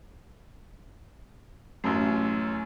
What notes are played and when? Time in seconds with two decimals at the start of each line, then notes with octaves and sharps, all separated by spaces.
1.84 A1 F#2 A3